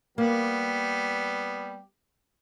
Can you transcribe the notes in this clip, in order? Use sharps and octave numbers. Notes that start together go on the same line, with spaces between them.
G3 A#3 B3 G4